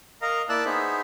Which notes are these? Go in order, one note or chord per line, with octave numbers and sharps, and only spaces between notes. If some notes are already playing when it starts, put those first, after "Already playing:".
A#4 D#5 F5 A#5
A#3 E4 D5 A5 E6 F#6
B3 D#4 G#4 C5 E5